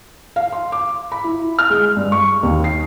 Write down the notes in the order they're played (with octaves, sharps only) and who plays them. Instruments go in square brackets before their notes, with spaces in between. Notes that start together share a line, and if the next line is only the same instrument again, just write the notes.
[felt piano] F5
C6
D6
B5
E4
F6
G#3
G2
C#6
D#2
C7